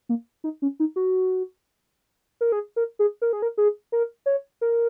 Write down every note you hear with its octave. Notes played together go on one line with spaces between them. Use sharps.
A#3
D#4
C#4
D#4
F#4
A#4
G#4
A#4
G#4
A#4
G#4
A#4
G#4
A#4
C#5
A#4